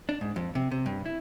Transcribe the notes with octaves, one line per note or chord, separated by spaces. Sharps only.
D4
G#2
F2
C3
C3
G2
E4